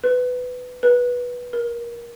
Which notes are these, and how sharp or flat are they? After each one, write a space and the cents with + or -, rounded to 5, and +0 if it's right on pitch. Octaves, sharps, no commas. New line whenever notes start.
B4 +15
B4 -15
A#4 +20